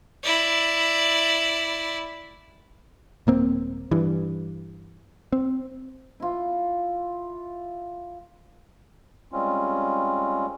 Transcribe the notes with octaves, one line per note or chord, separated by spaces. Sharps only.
E4 D5
D#1 A#3 C4
G2 E3
C4
E4 F4
G3 G#3 C4 C#4 F4